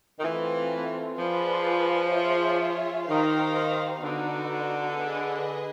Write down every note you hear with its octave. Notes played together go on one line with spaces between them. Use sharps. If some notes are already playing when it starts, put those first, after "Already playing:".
D#3
E3 A3 C4 F4
F3 F4 G#4 B4 D5
F4 G#4 C#5 E5
D#3 D#4 G4 C5 F5
D3 B3 D#4 F#4
G#4 B4 D#5